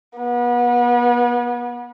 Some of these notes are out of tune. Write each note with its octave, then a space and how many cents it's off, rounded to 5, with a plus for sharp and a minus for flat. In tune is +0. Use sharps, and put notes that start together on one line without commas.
B3 -35